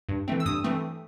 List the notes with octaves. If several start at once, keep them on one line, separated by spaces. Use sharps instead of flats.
G2
E3 A3 C4
E6
G2 D#6
E3 A3 C4